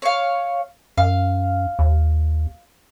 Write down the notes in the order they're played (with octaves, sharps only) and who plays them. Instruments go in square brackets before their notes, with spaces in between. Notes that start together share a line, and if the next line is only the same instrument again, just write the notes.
[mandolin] C#5 F5
[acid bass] F#2 [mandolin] F5
[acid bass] D#2